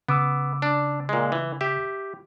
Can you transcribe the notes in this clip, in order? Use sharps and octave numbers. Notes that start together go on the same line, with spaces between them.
C#3 B3 D6 E6
D4
A#2 G#3
E3
G4 E5